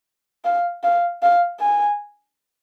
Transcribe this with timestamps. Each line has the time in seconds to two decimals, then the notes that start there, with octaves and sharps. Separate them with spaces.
0.45 F5
0.83 F5
1.22 F5
1.60 G#5